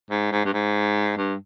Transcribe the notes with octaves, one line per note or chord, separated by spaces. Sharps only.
G#2
G#2
G2
G#2
G2